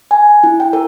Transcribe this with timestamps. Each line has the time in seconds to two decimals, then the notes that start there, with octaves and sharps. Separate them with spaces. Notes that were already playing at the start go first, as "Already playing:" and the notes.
0.11 G#5
0.44 E4
0.60 G5
0.73 A#4